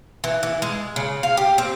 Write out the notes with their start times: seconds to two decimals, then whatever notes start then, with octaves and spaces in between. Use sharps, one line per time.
0.24 E3
0.43 E3
0.62 G#3
0.96 C#3
1.23 F5
1.37 G4
1.58 C4